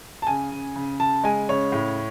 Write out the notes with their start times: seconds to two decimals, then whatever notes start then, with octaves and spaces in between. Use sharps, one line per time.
0.22 A5
0.27 C#3 G#5
0.52 C#3
0.75 C#3
0.99 C#3 A5
1.24 G#3 G#5
1.49 C#3 C#5
1.72 A2